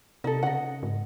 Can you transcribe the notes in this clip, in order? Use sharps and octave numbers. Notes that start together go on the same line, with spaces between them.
C3 D#4 A4
C#3 D#5 F#5
G#2